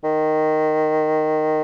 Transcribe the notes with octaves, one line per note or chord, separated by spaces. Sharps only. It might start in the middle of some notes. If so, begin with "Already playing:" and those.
D#3